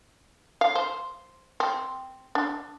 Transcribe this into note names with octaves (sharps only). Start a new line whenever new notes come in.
F5
C5
C4
D4